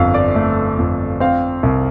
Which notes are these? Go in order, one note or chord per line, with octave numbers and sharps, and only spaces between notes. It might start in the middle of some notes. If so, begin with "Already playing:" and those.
Already playing: G1 F2 F5
D5
A3
F2
C4 F5
C2